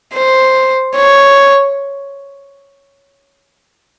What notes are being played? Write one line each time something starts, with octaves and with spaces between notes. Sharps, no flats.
C5
C#5